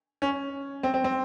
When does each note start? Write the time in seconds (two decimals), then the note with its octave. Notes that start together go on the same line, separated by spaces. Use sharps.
0.22 C#4
0.83 C4
0.94 C4
1.04 C4